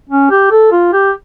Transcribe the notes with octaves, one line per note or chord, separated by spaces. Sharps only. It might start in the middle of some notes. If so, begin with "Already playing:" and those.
C#4
G4
A4
F4
G4